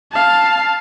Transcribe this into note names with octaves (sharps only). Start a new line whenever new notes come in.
F5 A5